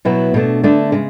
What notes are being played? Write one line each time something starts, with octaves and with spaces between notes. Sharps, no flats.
B2 F#3 B3 E4
B2 A3 D4
D3 A3 D4
C#3 G#3